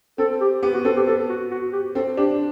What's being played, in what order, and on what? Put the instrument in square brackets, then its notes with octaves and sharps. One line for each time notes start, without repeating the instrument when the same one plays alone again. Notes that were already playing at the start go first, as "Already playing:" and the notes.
[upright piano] C4 [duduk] A4
[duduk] G4
[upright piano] B3 [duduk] G4
[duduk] F#4
[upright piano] C4 [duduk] A4
[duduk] G4
[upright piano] B3 [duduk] A4
[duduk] F#4
F#4
G4
[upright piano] C4 [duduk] A4
[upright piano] D4 [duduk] G4